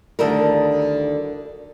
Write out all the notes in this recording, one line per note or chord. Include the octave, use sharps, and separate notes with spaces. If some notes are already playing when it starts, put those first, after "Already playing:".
D2 D3 D#3 G3 E4 A#4